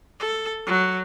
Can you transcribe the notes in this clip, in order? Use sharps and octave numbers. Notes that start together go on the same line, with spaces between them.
A4
F#3